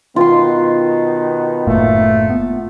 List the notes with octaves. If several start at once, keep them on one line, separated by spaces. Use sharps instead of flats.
B2 D#3 B3 F4 C6
F#1 A2 A3 A#3
B3